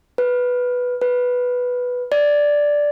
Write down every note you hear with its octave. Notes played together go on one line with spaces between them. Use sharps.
B4
B4
D5